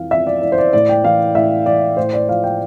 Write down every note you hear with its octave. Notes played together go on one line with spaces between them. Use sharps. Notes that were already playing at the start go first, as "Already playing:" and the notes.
Already playing: F2 E3 F5
F2 E5
D5
E3 D5
C5
D5
A2 D5
G5
E3 F5
A2 E5
E3 D5
A2 C5
D5
F3 F5
G5